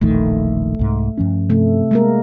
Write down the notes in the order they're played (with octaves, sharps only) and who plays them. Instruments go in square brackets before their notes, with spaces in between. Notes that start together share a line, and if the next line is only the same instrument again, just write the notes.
[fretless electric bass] E1 A#1 D#3 [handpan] A3
[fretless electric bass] C2 G#2
G2 F3 C#4
[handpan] C3 A3
G#3 A#3 A#4